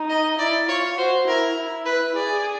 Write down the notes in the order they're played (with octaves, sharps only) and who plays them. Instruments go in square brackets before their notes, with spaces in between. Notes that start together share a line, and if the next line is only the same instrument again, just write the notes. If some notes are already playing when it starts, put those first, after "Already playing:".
Already playing: [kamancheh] D#4
[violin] D#5
[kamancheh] E4 [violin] D5
[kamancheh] F4 [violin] C#5
[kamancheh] F#4 [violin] C5
[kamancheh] E4 [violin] A#4
[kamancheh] E4
[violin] B4
[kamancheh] G#4 [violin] D5